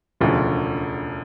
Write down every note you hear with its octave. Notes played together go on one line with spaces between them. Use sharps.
E1 D2 C#3 F3